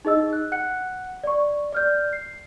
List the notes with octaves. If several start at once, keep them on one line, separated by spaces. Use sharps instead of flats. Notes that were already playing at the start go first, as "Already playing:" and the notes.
D#4 G#4 D#5 E6
F#6
F#5 F#6 C#7
D5 C#6
D5 F6 G6
C7